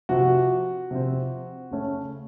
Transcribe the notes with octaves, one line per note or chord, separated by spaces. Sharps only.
C3 F3 C4 F#4
C3 F3 C4
C#3 A3 C#4